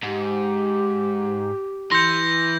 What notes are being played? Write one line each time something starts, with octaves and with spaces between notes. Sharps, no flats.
G#2 G4
E3 C6 G6 A#6 C#7